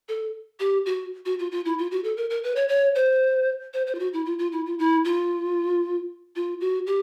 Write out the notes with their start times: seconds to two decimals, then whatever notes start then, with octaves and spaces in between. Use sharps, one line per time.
0.08 A4
0.59 G4
0.86 F#4
1.25 F#4
1.39 F4
1.51 F4
1.65 E4
1.78 F4
1.91 F#4
2.04 A4
2.17 A#4
2.30 A#4
2.44 B4
2.56 C#5
2.68 C#5
2.95 C5
3.73 C5
3.87 C5
3.95 F4
3.99 F#4
4.13 E4
4.25 F4
4.39 F4
4.52 E4
4.66 F4
4.79 E4
5.05 F4
6.36 F4
6.60 F#4
6.87 G4